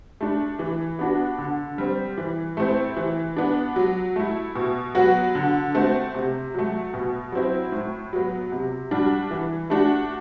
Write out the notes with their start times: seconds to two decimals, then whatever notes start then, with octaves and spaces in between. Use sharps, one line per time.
0.21 A3 D4
0.59 E3
0.99 B3 D4 F#4
1.38 D3
1.78 G3 C4
2.18 E3
2.57 A3 C4 E4
2.97 E3
3.36 B3 D4
3.76 F#3
4.16 A3 E4
4.55 B2
4.95 F#3 B3 F#4
5.35 D3
5.75 A3 C4 F#4
6.15 C3
6.54 F#3 A3
6.94 B2
7.32 F#3 C4 E4
7.72 A2
8.13 F#3 B3
8.52 C3
8.91 G3 D4 F#4
9.31 E3
9.70 A3 D4 F#4